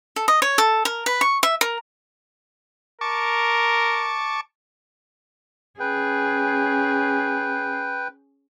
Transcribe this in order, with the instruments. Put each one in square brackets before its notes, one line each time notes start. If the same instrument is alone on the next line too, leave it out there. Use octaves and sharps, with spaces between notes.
[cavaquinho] A4
D#5
C#5
A4
A#4
B4
C#6
E5
A#4
[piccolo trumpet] A#4 [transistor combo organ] A5 C#6 D6
[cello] C#4 G#4 [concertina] B4 G5